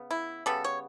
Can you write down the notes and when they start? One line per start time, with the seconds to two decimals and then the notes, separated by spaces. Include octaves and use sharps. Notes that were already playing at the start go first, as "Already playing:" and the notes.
Already playing: C#3 B3
0.11 E4
0.46 C#3 G3 B3 A4
0.64 C#5